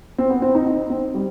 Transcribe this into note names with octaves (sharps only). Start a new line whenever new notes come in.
C4
B3
C4
D#4
D#4
C4
G3